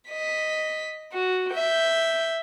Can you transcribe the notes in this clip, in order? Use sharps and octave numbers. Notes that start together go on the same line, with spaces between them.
D#5 B6
F#4
E5 G6